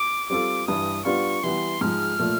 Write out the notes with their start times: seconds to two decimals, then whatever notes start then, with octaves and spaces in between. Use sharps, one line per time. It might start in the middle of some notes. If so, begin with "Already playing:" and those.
Already playing: D6
0.30 G3 C4 F4 A4 D6
0.68 G2 E3 G3 D#6
1.05 G3 B3 D4 F4 C#6
1.44 E3 G3 B3 C6
1.81 G#2 F3 G#3 F6
2.19 A#2 F3 A3